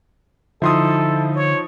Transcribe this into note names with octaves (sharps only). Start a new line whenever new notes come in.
D3 F3 D#4 E4 A4 C6 D#6
C#5